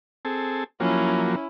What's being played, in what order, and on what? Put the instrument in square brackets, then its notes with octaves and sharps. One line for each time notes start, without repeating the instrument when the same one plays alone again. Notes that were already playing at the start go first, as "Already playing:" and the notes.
[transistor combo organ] C4 G#4 A4
[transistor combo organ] F3 F#3 A#3 [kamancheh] C#4 E4